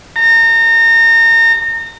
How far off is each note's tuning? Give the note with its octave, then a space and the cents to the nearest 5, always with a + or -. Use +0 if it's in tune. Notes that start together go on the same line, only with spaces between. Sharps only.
A#5 -30